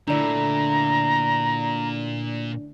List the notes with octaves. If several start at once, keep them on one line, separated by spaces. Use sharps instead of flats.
A#2 D3 A3 D4 E4 D5 A#5